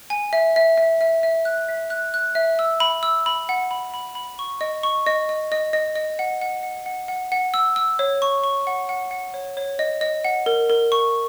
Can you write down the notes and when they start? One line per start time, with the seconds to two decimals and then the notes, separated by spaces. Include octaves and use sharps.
0.10 G#5
0.33 E5
0.56 E5
0.78 E5
1.01 E5
1.23 E5
1.45 F#6
1.68 E5
1.90 F#6
2.14 F#6
2.35 E5
2.59 E6
2.80 B5
3.03 E6
3.26 B5
3.49 F#5
3.71 B5
3.94 B5
4.15 B5
4.39 C#6
4.61 D#5
4.83 C#6
5.06 D#5
5.29 D#5
5.52 D#5
5.73 D#5
5.96 D#5
6.19 F#5
6.41 F#5
6.63 F#5
6.86 F#5
7.08 F#5
7.32 F#5
7.54 E6
7.76 E6
7.99 C#5
8.22 C#6
8.44 C#6
8.67 F#5
8.89 F#5
9.11 F#5
9.34 C#5
9.57 C#5
9.79 D#5
10.01 D#5
10.25 F#5
10.46 A#4
10.70 A#4
10.92 C#6